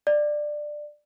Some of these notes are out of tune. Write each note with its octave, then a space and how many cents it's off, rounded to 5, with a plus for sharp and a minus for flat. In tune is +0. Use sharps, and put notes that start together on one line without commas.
D5 +15